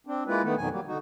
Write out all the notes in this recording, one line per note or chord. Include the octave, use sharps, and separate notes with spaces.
C4 D4
G#3 A#3 E4 F4 B4
D#3 A3 B3
F2 B2 D#3 F#3 G#5
F#3 G3 A#3
D3 D#4 F#4